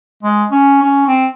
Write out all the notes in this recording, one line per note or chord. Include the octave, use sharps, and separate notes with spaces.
G#3
C#4
C#4
C4